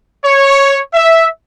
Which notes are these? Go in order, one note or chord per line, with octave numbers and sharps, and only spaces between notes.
C#5
E5